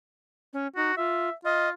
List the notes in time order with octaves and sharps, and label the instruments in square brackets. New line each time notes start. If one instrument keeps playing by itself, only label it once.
[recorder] C#4
[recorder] D#4 [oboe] F#4
[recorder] F4 [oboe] E5
[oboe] F4 [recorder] D#5